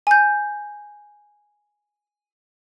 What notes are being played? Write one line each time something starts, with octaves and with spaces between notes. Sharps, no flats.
G#5 G6